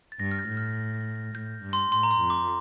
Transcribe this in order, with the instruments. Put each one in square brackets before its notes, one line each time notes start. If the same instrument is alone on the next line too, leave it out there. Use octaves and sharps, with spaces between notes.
[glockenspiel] A6
[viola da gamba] G2 [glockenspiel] A#6
[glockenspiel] F6
G6
[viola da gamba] A2
[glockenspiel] F6
[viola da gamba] A2 [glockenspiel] G6
[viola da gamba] G2
[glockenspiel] C6
[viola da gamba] A2 [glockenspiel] C6
[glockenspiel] A#5
C6
[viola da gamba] F2
[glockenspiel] D6